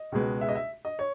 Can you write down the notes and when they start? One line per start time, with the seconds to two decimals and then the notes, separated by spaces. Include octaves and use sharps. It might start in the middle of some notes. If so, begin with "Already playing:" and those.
Already playing: D#5
0.12 C#2 B2 G#3 B3
0.41 E5
0.49 D#5
0.55 E5
0.85 D#5
0.99 C#5